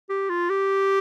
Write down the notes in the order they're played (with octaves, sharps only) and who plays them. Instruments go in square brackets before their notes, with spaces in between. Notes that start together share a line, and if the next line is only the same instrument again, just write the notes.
[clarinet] G4
F4
G4